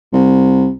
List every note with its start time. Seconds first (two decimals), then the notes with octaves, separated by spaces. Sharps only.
0.12 C2